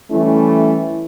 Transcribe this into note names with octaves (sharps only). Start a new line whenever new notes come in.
E3 G3 A3 C#4 E4